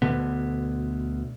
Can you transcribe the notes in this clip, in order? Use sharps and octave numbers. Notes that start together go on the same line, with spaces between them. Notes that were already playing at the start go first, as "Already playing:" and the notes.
D2 B2 D3 B3